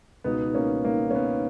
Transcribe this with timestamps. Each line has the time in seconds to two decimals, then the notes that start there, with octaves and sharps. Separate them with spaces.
0.24 C#2 B2 B3 D#4
0.54 A#3 C#4
0.85 A#3
1.10 C#4
1.15 B3